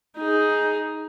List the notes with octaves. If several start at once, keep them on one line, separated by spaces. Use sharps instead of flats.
D#4 G#4